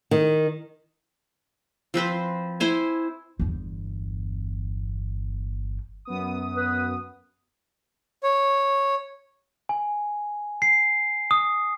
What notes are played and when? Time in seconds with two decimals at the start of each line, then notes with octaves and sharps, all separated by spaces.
0.11 D#3
1.94 F3 C4 B4 C5
2.60 E4 C5 G#5
3.40 G1 E2
6.05 F#2 B3 D#6
6.56 B4
8.23 C#5
9.69 G#5
10.62 C7
11.31 D#6